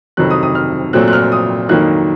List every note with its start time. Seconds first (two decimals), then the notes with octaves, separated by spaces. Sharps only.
0.17 F2 C3 D#3 F#3 F#6
0.30 D#6
0.43 D#6
0.55 F6
0.93 A#2 F#3 A3 C4 F#6
1.08 F#6
1.13 F6
1.32 D#6
1.69 F2 D#3 F#3 A#3 D#4 F#6